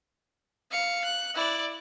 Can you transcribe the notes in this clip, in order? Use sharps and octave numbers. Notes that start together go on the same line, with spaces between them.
F5 C#7
F#6
E4 D5